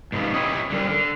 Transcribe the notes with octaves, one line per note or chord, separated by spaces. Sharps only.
G#2 C3 F3 B3
E4 G4 C#5 D#5
D3 G3 A#4
D3